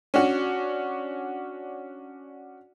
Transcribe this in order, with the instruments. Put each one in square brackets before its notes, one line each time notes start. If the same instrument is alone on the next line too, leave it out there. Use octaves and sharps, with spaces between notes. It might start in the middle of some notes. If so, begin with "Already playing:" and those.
[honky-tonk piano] C#4 D4 F#4